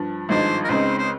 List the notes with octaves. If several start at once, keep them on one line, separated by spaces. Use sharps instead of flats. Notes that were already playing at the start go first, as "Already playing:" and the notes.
Already playing: G2 F3
G#1 G2 F3 G#3 D#4 C5
A#4
C#2 C#3 G#3 C4 D#4 C5
C5